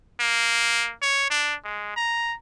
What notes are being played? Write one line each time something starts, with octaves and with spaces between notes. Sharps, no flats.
A#3
C#5
D4
G#3
A#5